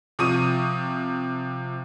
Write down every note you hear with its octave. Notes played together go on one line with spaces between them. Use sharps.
C3 F3 C#6 D#6 D#7